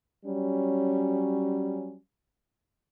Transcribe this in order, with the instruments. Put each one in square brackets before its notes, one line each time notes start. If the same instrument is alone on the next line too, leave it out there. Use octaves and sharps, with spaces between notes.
[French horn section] F#3 G3 C#4